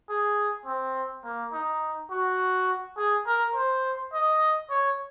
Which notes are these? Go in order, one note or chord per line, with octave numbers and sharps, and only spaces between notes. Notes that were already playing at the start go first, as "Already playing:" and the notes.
G#4
C4
A#3
D#4
F#4
G#4
A#4
C5
D#5
C#5